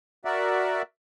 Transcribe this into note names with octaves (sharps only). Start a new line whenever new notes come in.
F#4 A#4 D5 E5